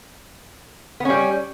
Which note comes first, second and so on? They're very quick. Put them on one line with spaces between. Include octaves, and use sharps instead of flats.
B3 C#4 G3